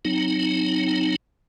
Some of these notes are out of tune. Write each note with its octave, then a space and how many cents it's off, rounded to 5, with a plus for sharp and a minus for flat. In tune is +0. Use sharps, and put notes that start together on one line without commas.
F#3 +0 C4 -15 D#4 +0